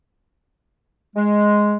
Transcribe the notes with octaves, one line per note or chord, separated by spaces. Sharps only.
G#3